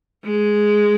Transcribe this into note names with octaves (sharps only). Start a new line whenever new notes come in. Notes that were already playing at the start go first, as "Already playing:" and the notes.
G#3